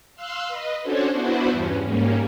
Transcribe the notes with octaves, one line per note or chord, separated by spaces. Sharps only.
F5 C6 E6 F#6
B4 D#5
C#4 D4 F#4 A4 C5 C#5
B3 D4 E4 F#4 B4 C5
E2 G2 C#4
G#2 G3 A#3 C#4